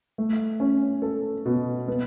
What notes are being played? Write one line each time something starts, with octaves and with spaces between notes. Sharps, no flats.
A3
C#4
A4
B2
B3